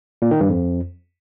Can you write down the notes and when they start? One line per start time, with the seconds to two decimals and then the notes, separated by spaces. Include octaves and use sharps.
0.22 A#2
0.31 D#3
0.40 G2
0.50 F2